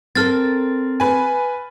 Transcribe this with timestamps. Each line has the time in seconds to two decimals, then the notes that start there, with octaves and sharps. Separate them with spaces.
0.15 C4 A4 A#4 F6 A6
1.00 B4 G#5